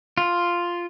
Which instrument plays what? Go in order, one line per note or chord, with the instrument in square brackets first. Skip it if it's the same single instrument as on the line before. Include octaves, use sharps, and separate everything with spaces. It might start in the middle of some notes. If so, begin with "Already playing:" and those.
[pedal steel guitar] F4